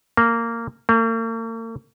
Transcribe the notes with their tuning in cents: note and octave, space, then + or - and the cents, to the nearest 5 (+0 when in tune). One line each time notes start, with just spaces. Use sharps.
A#3 -15
A#3 -45